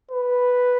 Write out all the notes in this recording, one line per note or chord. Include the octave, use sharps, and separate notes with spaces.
B4